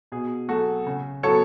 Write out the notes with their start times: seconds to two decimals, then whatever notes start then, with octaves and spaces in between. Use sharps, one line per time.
0.12 B2 G#4
0.48 F#3 A3 F#4 A4
0.86 C#3
1.23 F#3 B3 A4 C#5